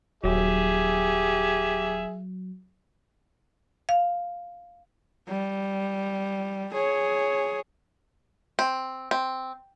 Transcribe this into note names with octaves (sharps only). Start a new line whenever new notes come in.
D#1 F#3 G4 G#4 E5
F5
G3
G#4 C#5
C4
C4